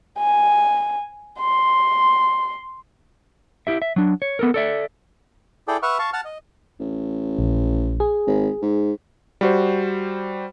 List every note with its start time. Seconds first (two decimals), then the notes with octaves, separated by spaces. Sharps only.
0.19 G#5
1.40 C6
3.67 E4 G4 E5
3.82 E5
3.96 F#3 D4
4.22 C#5
4.39 B3 A4 A#4
4.54 A4 D5 E5
5.68 E4 G#4 A4 D5 G5
5.82 B4 E5 F#5 C#6 F6
5.99 F5 A5 C#6
6.13 F#5 A5 F6
6.25 D#5
6.80 A1
7.39 A#1
8.00 G#4
8.27 G#1
8.62 G#2
9.41 G3 F#4 C5